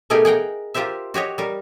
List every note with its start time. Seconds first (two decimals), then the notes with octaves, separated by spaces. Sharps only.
0.10 B2 A3 D#4 G4 G#4 A#4
0.25 G#4 F#5 G5 A#5
0.74 F4 G4 A#4 C5 E5
1.14 F#4 G4 C#5 D#5
1.38 G3 A#4